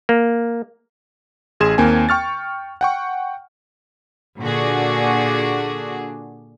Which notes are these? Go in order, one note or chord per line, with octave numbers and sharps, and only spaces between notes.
A#3
A1 G#4 C6 G#6 E7
D#2 A#3 C4 G#5
G5 C#6 F6 A6
F#5 G5 C#6
A#2 D3 D4 F#4 G#4